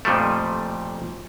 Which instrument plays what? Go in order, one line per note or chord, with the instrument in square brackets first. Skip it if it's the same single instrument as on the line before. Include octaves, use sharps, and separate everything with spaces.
[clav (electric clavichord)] F2 A#2 F3 G3 A3